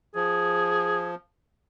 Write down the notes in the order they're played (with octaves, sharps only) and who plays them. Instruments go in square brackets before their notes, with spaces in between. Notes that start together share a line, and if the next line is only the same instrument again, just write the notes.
[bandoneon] F3 [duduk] G#4